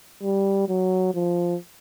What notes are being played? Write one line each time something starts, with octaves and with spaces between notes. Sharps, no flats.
G3
F#3
F3